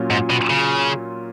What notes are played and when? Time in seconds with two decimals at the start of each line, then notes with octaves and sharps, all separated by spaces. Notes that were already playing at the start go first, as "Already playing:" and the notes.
Already playing: A#2 F#3 C#4 F4
0.10 G#2
0.30 B2
0.50 C#3